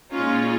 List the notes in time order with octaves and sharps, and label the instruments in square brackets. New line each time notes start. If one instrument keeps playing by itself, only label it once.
[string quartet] A#2 G#3 D#4 [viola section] C#4 F4